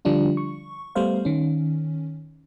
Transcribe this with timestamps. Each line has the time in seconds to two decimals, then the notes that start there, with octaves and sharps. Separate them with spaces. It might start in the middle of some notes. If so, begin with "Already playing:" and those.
0.05 D3 F3 G3 D4 F4
0.37 C#6
0.95 G3 A3 B3 C5 F5
1.25 D#3 C#4